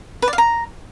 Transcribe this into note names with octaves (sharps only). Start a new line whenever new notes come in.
B4
D5
F5
A#5